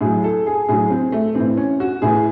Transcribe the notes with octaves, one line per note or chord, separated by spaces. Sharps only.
A2 F#3 G#4
A4
G#4
A2 F#3 G#4
C4
A3
A2 E3 C4
C#4
F#4
A2 E3 G#4